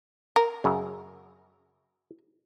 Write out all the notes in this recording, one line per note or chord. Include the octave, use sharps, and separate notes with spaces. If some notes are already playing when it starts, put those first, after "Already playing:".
A#4
F#2 C#3